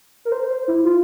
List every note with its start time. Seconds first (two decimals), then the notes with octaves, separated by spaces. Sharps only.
0.25 A#4
0.32 C5
0.50 C5
0.68 E4
0.85 F4